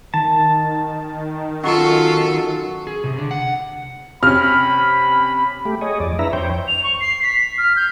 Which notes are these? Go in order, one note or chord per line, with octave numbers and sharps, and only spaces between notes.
D#3 A5
F#3 C#4 F4 A4
G#4
C3
D3
F#5
C3 C#4 B5 F6
A3 G4
G#4 C#5 D#5
F2 D5
D4 E4 B4 E5 A#5
F2 C5 C#5 G5
F7
C#6
C7
B6
F6
G6